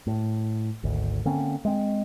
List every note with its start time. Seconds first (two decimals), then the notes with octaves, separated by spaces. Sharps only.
0.07 A2
0.83 G#1 D2
1.25 D3 A#3 C4 C#4
1.65 G#3 C4